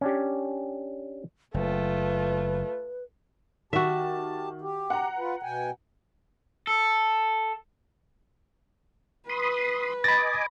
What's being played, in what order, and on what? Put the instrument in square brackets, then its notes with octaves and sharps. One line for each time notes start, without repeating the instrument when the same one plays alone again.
[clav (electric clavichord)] C#4 D4 G4
[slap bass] F#1 [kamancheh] A3 F4 [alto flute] B4
[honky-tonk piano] D#3 [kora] F#4 E5 [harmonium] G4 A5
[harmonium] G4
[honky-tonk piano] F#5 A#5
[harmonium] F4 B4
B2 G5 G#5
[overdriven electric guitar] A4
[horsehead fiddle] B4 [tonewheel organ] B5 C6 D#6
[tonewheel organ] D#5 G#5 D6 [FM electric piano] B5 A#6 [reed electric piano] A6